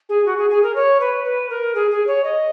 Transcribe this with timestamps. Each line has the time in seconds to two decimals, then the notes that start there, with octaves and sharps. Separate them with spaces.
0.09 G#4
0.26 F#4
0.38 G#4
0.50 G#4
0.63 A#4
0.75 C#5
1.00 B4
1.25 B4
1.50 A#4
1.75 G#4
1.91 G#4
2.07 C#5
2.24 D#5